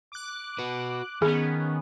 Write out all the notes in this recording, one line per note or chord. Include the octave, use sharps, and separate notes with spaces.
D6 F#6
F#4 B4
D#3 B3 C#4 G#4